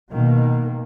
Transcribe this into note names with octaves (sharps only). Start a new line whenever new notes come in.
B2 D#3 A#3